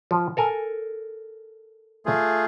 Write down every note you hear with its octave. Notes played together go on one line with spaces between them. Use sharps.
F3
A4 A#4 G#5
A3 F4 G#4